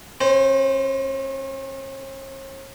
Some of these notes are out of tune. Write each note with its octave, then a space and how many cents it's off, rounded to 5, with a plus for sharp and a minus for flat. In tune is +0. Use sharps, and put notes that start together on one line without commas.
C#4 -45 C5 -10